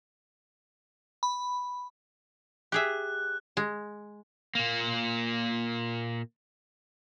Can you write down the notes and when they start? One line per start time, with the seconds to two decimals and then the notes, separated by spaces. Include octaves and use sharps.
1.23 B5
2.72 G4 G#4 E5 F#6
3.57 G#3
4.55 A#2 A#3